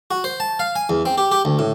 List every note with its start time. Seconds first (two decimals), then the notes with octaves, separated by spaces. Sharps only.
0.11 F#4
0.24 C5
0.40 A5
0.59 F5
0.76 G#5
0.89 E2
1.06 C4
1.18 G4
1.32 G4
1.45 D2
1.59 A2